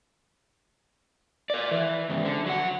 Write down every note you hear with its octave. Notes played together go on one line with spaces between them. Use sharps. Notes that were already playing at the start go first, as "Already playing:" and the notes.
A#4 D5
E3
G#2 C#3
D3
F#3 F#5